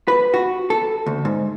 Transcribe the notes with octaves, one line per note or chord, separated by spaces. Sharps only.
B4
F#4
A4
D2
G#2